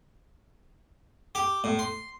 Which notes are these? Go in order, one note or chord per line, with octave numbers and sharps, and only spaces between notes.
G4
A2
C6